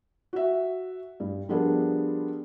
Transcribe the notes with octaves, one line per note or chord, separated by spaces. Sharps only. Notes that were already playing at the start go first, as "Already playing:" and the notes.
F#4 E5
G2
F3 G3 B3 D4 G#4 A#4